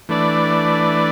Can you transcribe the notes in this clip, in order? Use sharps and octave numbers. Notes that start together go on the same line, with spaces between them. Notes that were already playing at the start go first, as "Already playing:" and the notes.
E3 A3 D4 B4 D5